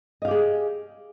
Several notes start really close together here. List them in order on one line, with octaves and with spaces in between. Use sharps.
D#5 F5 G4 G#4